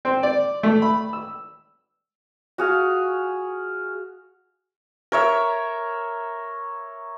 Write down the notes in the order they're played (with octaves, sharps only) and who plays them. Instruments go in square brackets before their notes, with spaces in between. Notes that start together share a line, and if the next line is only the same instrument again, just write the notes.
[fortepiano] C4
D5
A3
B5
E6
[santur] F#4 G#4 F5
A#4 C#5 E5